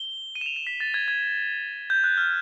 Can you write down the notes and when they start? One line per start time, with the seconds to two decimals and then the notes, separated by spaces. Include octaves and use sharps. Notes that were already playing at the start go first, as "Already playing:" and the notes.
Already playing: G7
0.35 D#7
0.41 E7
0.46 F7
0.56 E7
0.67 B6
0.80 A6
0.94 G#6
1.08 G#6
1.90 G6
2.04 F#6
2.17 F6